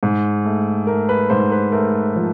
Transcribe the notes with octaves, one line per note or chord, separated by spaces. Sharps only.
G#2
A3
A3 A#4
B4
G#2 C5
B4
A3 A#4
F3